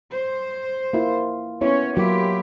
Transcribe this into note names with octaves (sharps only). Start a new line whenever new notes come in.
C5
A#3 E4 F4
B3 C#4 E4 C#5
F#3 A#3 E4 F4 G4